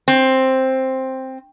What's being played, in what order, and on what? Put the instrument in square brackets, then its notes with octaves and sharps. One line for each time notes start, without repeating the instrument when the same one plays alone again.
[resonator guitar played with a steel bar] C4